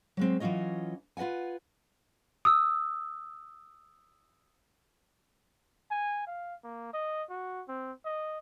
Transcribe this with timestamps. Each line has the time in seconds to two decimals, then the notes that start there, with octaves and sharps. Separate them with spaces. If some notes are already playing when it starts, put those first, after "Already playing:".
0.17 F#3 G#3 C4
0.40 E3 F#3 C#4 F4 C#5 D#5
1.17 F4 B4 D#5 F#5 G#5
2.45 D#6 E6
5.91 G#5
6.27 F5
6.64 A#3
6.93 D#5
7.30 F#4
7.68 C4
8.05 D#5